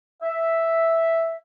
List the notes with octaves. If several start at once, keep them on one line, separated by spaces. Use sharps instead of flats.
E5